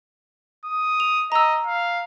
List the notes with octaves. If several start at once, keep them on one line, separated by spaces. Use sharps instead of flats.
D#6
F7
D#5 A#5 E6
F5